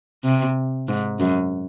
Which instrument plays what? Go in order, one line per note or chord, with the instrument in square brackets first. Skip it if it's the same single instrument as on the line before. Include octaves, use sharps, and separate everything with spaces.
[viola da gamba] C3
G#2
F#2